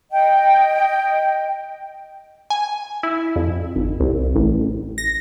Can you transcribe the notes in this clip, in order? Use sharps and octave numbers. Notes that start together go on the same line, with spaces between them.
D#5 G5
G#5
E4
F2
G#1
C2
A1
A#6